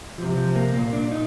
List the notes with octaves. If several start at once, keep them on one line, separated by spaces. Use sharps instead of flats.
C3 F3
F3
A#3
A#2 A#3
D4
D#4